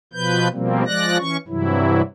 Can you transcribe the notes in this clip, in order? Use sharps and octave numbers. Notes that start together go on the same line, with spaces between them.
B2 F3 B4 G6
B2 F3 G3 A#3 C4
F3 G#3 D5 F#6 A#6
E3 C#4 C#6
G2 C3 E3 F#3 E4